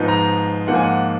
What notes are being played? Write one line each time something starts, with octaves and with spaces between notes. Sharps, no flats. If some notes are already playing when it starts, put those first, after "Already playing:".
Already playing: G#2 F3 B3 D#4
A#5
G#2 F3 A#3 F4 F#5
G#5
F#5